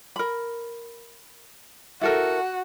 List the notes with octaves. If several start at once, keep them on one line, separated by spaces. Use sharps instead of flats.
A#4 B5
E4 F#4 A4 A#4